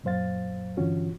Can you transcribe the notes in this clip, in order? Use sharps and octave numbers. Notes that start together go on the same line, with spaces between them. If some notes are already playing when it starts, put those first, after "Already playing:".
F#2 A#2 F#3 C5 F5 A6
G2 D3 E3 C#4 F4 F#4